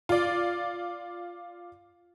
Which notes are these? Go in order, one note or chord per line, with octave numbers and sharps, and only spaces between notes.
F4 D5